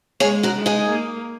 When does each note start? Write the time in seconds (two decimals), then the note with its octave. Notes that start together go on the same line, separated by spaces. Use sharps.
0.20 G#3 G#4 C#5
0.43 F#4 A#4
0.55 G#3
0.66 D#4 G#4
0.89 A#3